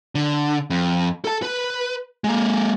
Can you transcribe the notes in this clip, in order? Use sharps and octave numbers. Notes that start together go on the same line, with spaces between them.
D3
F2
A4 A5
B4
G#3 A#3